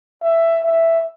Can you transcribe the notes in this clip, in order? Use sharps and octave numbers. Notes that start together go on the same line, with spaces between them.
E5
E5